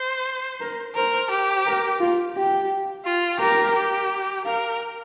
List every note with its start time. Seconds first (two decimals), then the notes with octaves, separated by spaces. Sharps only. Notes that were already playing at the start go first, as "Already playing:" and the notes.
Already playing: C5
0.60 A#4
0.95 A#4 C5
1.31 G4
1.66 A#4
2.00 F4
2.36 G4
3.05 F4
3.40 G4 A#4
3.76 G4
4.45 A#4 F5